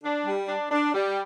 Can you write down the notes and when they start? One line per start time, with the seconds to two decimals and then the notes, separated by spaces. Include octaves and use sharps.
0.04 D4
0.26 G3
0.48 D4
0.71 D4
0.94 G3